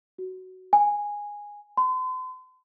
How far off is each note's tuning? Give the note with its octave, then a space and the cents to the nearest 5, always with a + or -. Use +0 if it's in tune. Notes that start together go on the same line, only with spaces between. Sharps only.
F#4 +10
G#5 -10
C6 -40